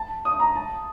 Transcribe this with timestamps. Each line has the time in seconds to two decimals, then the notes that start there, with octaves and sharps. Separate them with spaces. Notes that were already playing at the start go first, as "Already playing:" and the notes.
Already playing: A5
0.25 D#6
0.40 A#5
0.55 A5